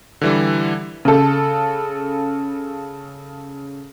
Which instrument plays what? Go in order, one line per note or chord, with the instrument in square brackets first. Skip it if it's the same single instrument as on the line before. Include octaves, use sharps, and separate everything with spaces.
[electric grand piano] D3 E3 G3
[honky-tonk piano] C#3 A4